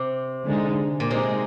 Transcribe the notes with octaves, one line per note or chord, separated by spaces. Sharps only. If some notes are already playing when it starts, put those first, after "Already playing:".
Already playing: C3
D3 G#3 D#4
A#2
C3 G#3 D#4 G#4